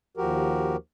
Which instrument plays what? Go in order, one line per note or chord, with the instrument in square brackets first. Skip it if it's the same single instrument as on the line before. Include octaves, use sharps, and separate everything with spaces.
[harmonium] D#2 F3 F#4 G4 A#4